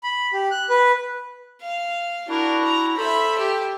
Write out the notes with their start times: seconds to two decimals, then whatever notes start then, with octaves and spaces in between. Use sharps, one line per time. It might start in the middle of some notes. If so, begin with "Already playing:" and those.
0.03 B5
0.33 G4
0.51 F#6
0.70 B4
1.62 F5
2.28 D4 E4 F#4 A#4
2.65 A#5
2.96 A4 C5 E5 B5
3.35 G4 E5